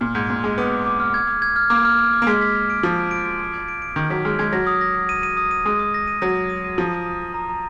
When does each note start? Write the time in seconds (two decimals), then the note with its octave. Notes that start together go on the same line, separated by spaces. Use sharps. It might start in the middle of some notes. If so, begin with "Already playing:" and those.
0.01 A#2 F6
0.15 G#2 G#6
0.29 A#2 F6
0.44 G#3 D6
0.58 B3 D6
0.72 D6
0.86 D6
1.00 F6
1.14 G#6
1.28 G#6
1.42 G#6
1.56 F6
1.70 A#3 D6
1.85 F6
1.99 G#6
2.13 D6
2.22 A#3
2.27 G#3 B6
2.42 B6
2.56 B6
2.70 D7
2.83 F3 F6
2.98 D7
3.11 D7
3.26 D7
3.40 G#6
3.54 G#6
3.69 D7
3.82 D7
3.96 D#3 G#6
4.10 F#3 B6
4.25 G#3 F6
4.39 G#3 G#6
4.53 F#3 A#6
4.67 D#6
4.81 A#6
4.95 A#6
5.09 D#7
5.23 D#7
5.37 D#6
5.51 D#7
5.66 G#3 D#6
5.79 D#6
5.94 A#6
6.08 D#7
6.22 F#3 A#6
6.36 D#6
6.50 D#7
6.64 D#7
6.78 F3 A#5
6.92 D#6
7.06 D#6
7.21 D#6
7.34 A#5
7.49 A#5